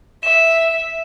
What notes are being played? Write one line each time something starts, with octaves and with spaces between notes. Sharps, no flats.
E5 E7